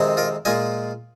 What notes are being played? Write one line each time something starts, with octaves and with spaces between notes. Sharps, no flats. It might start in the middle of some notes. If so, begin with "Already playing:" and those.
Already playing: F2 C3 D#3 G#3 C4
F4 A#4
A#2 G#3 F4 D#5 G#5